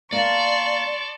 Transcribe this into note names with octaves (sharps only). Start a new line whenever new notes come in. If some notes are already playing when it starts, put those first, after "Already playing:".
A#3 D5 F5 A5 C6 C#6